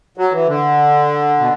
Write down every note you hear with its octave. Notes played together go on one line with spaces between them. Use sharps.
F#3
E3
D3
B2